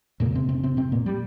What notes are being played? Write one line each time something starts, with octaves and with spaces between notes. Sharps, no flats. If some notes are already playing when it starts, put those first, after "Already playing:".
F2 A#2 C#3 A#3
C3 C4
C3 C4
C#4
C3 C4
C3 C4
A#2 A#3
G3